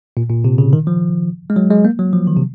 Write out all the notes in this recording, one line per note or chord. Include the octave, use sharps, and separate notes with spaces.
A#2
A#2
C3
C#3
D#3
F3
G#3
F#3
G#3
A#3
F#3
F3
D#3
C3